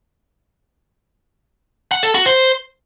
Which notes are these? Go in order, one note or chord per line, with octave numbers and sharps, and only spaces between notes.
F#5
A4
F#4
C5